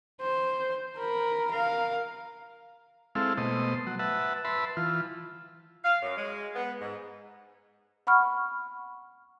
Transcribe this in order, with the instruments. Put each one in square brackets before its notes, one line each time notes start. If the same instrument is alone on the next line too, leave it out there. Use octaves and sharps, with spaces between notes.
[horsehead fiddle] C5
A#4 B5
A#4 F5
[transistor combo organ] G#3 C4 E4 A4 F5
B2 A3 C5 D#5
F#3
B4 E5 F#5 A5
B4 E5 A5 B5 C6
E3 F4
[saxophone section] F5
F#2
G#3
B3
G#2
[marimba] F#5 B5 C#6 F6